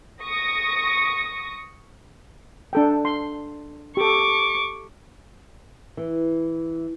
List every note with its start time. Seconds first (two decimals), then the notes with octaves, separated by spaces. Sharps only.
0.22 C#6 D#6 A#6
2.73 D4 A4 G5
3.05 C6
3.97 G4 A4 C#6 D6
5.97 E3